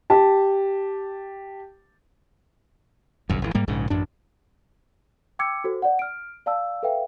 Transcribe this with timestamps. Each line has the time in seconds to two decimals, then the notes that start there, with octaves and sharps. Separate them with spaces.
0.10 G4 A5
3.29 G1 C2 F#2
3.42 G#1 B2 E3
3.55 G#2 G3 A#3
3.68 A#1 G#2 C#3
3.90 A1 F#2 D4
5.39 G5 D6 E6 G#6 C#7
5.64 F#4 A4 C5
5.82 D5 F#5
5.99 F6 D7
6.46 D5 F5 A5 E6
6.83 A4 B4 E5 F5 G5